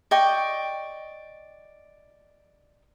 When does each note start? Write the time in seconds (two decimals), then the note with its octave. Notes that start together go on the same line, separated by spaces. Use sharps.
0.11 D5 D#5 G5 C#6